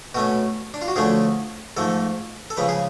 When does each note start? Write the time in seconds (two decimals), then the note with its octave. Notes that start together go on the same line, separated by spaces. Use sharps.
0.14 B2 A3 C#4 F#4
0.74 D4
0.82 F4
0.88 F#4
0.96 D2 D3 F3 A3 C#4 G#4
1.77 G#2 F3 A3 A4
2.50 A4
2.57 C#3 F3 G#3 B4
2.69 G#4